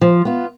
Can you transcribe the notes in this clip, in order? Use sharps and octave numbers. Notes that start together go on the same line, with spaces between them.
F3
B3 F4